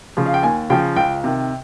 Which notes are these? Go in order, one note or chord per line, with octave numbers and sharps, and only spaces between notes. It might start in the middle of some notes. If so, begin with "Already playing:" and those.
C#3 F3
F5
G5
D#2 G#5
C#3 F3 G5
C#2 G5
C3 D#3